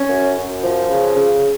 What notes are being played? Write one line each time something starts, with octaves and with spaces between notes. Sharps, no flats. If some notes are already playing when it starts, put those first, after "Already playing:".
Already playing: C#4
F#2
F#2
F3
C#3
C#3